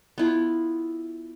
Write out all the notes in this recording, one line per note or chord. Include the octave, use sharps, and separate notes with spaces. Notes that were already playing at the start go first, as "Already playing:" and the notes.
B3 E4 F4